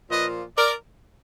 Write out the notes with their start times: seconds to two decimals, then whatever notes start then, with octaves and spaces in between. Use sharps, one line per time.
0.10 A#2 F3 A#3 F4 B4 D#5
0.58 A#4 D5